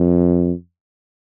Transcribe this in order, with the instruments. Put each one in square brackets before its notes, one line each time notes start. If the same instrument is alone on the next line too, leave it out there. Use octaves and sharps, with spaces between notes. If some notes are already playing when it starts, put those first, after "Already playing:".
Already playing: [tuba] F2